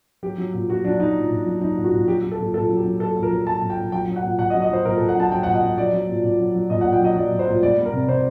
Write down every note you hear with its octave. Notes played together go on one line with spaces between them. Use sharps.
F#3 G4
F#3
A#2
A#2 F#4
F#3 D4
F#3 D#4
A#2
A#2
F#3
F#3 D#4
A#2
F#4
A#2
F#3 G4
F#3
A4
A#2
A#2 A4
F#3
G4
F#3
A#2 A4
A#2
A#4
F#3
F#3 A5
A#2
G5
A#2
F#3 G5
F#3
F#5
A#2
A#2 F#5
D#5
F#3
D#5
F#3 C5
A#2 A#4
A4
A#2
F#5
F#3 A5
F#3 G5
A#2 F#5
D#5
A#2
F#3 D5
F#3
A#2
A#2
F#3
F#3
A#2 D#5
F#5
A#2
G5
F#3 D#5
F#3 D5
A#2
C5
A#2
G3 D5
G3
A#4
C3
C3 C5